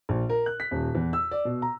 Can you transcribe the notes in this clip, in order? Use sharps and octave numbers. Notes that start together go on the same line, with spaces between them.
A#1
A#4
F#6
B6
D#1
E2
E6
D5
B2
A#5